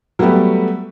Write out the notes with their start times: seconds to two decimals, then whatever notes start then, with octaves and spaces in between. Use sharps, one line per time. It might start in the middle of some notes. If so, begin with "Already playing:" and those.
0.19 F#3 G3 A3 B3 G4